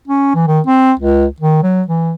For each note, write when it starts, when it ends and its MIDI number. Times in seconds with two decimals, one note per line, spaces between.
0.08 0.33 61
0.35 0.47 52
0.48 0.60 51
0.67 0.92 60
0.99 1.25 37
1.40 1.62 51
1.63 1.83 54
1.88 2.14 52